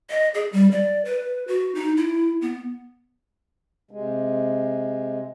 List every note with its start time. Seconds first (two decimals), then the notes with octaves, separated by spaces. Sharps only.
0.10 D#5
0.34 G#4
0.52 G3
0.71 D5
1.05 B4
1.48 F#4
1.75 D#4
1.97 E4
2.42 B3
3.91 C3 G#3